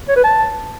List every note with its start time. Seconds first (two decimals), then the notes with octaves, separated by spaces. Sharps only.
0.08 C#5
0.16 B4
0.24 A5